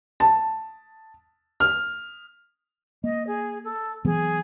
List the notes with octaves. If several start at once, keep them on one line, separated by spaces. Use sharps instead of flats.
A5
F6
A#3 D#5
G#4
A4
E3 F#3 B3 G#4